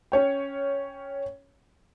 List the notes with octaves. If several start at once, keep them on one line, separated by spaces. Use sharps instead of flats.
C#4 C#5 G5